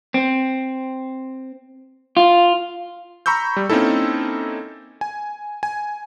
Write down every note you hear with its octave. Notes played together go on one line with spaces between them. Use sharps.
C4
F4
A#5 B5 C#6 E6 G6
G3
A#3 C4 C#4 D#4 E4 A4
G#5
G#5